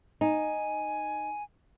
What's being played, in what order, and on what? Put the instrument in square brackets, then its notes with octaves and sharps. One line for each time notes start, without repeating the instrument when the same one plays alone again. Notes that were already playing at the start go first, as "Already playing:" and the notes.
[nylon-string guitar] D#4 [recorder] G#5